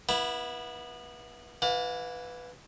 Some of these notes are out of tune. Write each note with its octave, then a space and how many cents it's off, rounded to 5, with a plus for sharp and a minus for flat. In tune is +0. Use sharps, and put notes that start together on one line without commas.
B3 -25 E4 +0
E3 +0 F5 +45